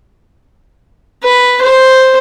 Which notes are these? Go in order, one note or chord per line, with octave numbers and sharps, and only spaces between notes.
B4
C5